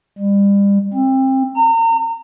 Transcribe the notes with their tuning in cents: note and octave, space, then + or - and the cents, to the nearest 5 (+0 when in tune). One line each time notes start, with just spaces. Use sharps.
G3 +35
C4 +25
A#5 -35